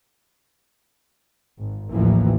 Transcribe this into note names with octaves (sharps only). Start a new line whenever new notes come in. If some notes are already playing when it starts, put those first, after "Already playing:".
G#1
A1 D#2 E3 F3 A#3